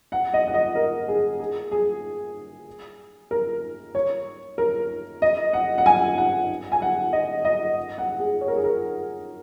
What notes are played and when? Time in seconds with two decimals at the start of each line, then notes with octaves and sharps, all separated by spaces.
0.12 F#5
0.34 D#5
0.47 F#5
0.54 D#5
0.75 A#4
1.08 G#4
1.40 G#4
1.71 G#4
3.31 A#4
3.95 C#5
4.58 A#4
5.22 D#5
5.53 F#5
5.78 F#5
5.86 G#5
6.18 F#5
6.72 G#5
6.82 F#5
7.13 D#5
7.45 D#5
7.98 F#5
8.19 G#4
8.41 C#5
8.48 A#4
8.56 G#4
8.64 A#4